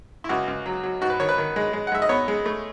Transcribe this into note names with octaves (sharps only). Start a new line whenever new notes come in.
E4
C#2 F#4
C#2
F#3
F#3
G#2 F#4
B4
D#3 C#5
B4
D#3
G#3
G#3
F#5
G#3 E5
D#5
B3 C#5
G#3
A3